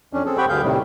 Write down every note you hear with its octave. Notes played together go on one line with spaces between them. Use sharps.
F2 C#4 D4
C4 G#4 A4
C4 G4 F#5 G5 B5 C#6
D2 G2 D3 G#4 F5 G6
A2 C3 D#3 G3